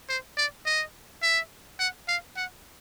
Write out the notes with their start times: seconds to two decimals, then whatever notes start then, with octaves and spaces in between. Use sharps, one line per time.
0.09 C5
0.37 D5
0.66 D#5
1.22 E5
1.79 F#5
2.08 F5
2.37 F#5